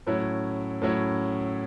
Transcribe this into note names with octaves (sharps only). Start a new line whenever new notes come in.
A2 F#3 C#4 E4
A2 F#3 C#4 E4